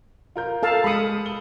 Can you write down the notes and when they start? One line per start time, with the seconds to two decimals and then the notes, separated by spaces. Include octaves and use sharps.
0.36 F4 A#4 G6
0.63 A4 F5 A5
0.84 G#3 B5 D#6 C#7
1.26 G7